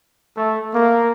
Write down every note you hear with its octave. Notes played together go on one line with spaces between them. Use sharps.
A3
A#3